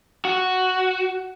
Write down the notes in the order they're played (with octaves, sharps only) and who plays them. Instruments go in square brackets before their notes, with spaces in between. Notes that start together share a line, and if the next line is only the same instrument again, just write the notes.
[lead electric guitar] F#4